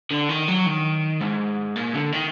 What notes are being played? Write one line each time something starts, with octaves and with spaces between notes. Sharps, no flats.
D3
D#3
F#3
D#3
G#2
A#2
D3
D#3